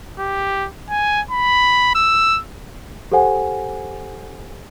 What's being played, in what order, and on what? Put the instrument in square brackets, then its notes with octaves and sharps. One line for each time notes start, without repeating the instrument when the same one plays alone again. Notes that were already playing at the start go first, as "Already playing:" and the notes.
[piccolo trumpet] G4
G#5
B5
E6
[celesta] G4 A4 C5 F#5 G#5